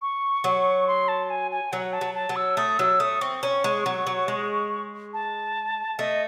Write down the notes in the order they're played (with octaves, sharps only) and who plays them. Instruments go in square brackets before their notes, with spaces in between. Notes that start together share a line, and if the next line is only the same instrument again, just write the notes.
[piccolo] C#6
[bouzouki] F#3
[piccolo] C6
A5
G#5
G#5
[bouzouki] F#3 [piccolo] F#5
[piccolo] A5
[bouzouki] F#3
[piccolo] A5
[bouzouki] F#3
[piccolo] E6
[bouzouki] A3 [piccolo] D#6
[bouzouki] F#3 [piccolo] E6
[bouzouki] A3 [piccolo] D#6
[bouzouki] C4 [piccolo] C#6
[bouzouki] C#4
G#3
F#3
F#3
G#3
[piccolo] A5
[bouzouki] A3 [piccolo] D#5